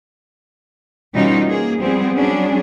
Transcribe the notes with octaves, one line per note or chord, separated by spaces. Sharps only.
B2 E3 G3 C#4 D#4 F4
A#3 G#4
F3 G3 B3 C4 G#4
F#3 G3 C#4 D4 G#4